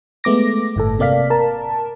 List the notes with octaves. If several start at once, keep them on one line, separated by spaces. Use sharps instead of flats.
G#3 A3 B3 D6 A#6
G1 A2 A4
C3 A#3 D5 F5 B6
A#4 A5